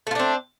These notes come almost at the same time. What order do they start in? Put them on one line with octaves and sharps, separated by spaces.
A3 F4 D4 C4